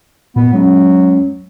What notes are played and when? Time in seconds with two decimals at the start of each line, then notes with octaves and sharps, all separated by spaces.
0.36 A#2 B3
0.53 F#3 G#3 C#4